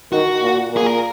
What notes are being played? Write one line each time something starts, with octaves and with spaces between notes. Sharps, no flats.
D#3 F#4
A#2
A#2
G#4
A#4